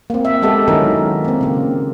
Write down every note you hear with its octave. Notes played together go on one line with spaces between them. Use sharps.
A#3 C4
E5
G#3 B3 G4 A4
D#3 F#3 C#4 D#4 E4 A#4
A#3 C4
C#3 A#3